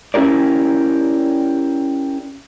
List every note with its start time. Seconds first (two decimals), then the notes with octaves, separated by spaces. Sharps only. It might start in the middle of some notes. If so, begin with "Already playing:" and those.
0.14 C#4 E4 G4 A#4 D5